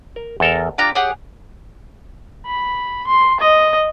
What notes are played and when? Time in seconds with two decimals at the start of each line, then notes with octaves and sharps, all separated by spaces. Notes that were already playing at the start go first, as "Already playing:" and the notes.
0.16 A#4
0.40 E2 A4 A#4
0.78 D4 F4 G4 A#5
0.95 G4 G#4 C#5 F#5
2.46 B5
3.07 C6
3.40 D#5